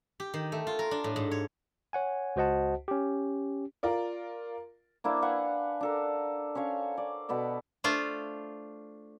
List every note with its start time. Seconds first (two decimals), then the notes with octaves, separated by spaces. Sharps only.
0.20 G4
0.34 D#3
0.52 A3
0.67 F4
0.79 A#4
0.91 D4
1.04 A2
1.16 G#2
1.31 C#5
1.93 C#5 F#5 G#5
2.36 C#2 F#4 C5 D#5 F#5 A5
2.88 C#4 G4
3.83 F4 A#4 D5
5.04 A#3 D4 E4 C5
5.22 B4 F5 F#5 G#5
5.81 D4 A4 A#4
6.55 C#4 C5 C#5 F5
6.98 D5
7.29 B2 B3 A4 D5
7.84 A3 D4 F4 C5